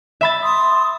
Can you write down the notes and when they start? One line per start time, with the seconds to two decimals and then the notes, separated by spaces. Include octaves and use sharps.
0.21 E5 B5 A6
0.43 C6 D#6